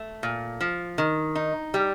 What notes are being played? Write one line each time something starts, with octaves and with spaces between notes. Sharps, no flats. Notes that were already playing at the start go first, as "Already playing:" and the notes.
Already playing: A3
A#2
F3
D#3
D#4
G3